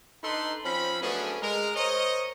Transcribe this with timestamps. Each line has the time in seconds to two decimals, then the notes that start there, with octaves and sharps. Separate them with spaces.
0.23 D4 D#4 A4 B4 B5 C6
0.64 F3 C4 C#4 B5
1.02 F#3 A3 B3 C#4 D4 G#4
1.41 G#3 A#4
1.75 A#4 C5 C#5 D#5